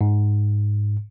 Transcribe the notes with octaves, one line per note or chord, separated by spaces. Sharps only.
G#2